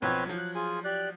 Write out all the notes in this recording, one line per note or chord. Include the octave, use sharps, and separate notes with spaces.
B1 F3 C4 B4 C#5 G#6
F3 F#3
F#6
F4 G#4 G#5
G4 D5 F#6